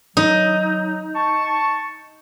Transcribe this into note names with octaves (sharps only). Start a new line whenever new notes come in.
F#3 D#4
A5 C#6